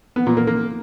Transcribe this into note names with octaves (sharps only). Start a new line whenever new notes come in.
B3
A#2
A#3
A#3